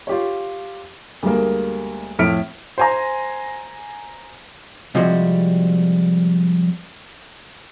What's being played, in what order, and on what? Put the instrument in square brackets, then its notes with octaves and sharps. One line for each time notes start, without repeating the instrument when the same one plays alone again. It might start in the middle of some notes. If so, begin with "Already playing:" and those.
[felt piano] F4 G4 C#5
D2 G3 G#3 A#3
F2 A2 E4 F6 B6 D7
[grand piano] C5 G#5 A#5
[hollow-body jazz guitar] C3 F3 G3 G#3 F#4